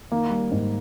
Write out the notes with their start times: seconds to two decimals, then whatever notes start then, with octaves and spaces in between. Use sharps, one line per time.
0.12 D#3 A#3
0.30 G3
0.51 G#2